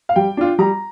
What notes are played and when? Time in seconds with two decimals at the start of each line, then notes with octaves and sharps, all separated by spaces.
0.09 F5
0.16 G3 G5
0.37 D4 F4
0.59 G3 A#5